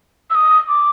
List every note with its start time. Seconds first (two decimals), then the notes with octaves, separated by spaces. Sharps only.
0.30 E6
0.35 D#6
0.68 D6